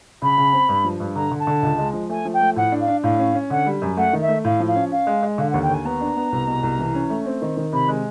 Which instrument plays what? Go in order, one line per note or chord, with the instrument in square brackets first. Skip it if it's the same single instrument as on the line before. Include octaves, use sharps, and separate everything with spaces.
[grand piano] C#3 [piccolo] B5
[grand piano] C#3
C4
G2
F3
G2
[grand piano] D3 [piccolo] A#5
[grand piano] D3
[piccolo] A5
[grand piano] D3
C#2
G#3
F3
[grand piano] A3 [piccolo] G#5
[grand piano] F3
[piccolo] G5
[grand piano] A3
[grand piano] A2 [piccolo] F#5
[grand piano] D4
[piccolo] F5
[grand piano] D4
[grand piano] A2 [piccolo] F5
[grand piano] C#4
C#4
[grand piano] D3 [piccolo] F#5
[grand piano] G3
F#2
[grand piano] A3 [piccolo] F#5
[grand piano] D#3
[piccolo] E5
[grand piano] A3
[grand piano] A2 [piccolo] F5
[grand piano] F3
[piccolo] F5
[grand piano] C#4
[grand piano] C#4 [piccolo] F5
[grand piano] G#3
G#3
[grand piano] D3 [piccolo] F5
[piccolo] F#5
[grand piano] D#2
[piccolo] G5
[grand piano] D#2 [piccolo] G#5
[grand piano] B3 [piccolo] A#5
[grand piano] D4
B3
C2
B2
C2
E3
C#4
A3
C4
D#3
D#3
[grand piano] C3 [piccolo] B5
[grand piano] G#3